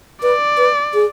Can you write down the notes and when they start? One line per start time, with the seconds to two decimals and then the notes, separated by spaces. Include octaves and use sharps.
0.23 B4 D5
0.58 B4
0.94 G#4